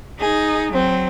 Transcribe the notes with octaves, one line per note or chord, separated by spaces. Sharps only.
D#4 G#4
F#3 C4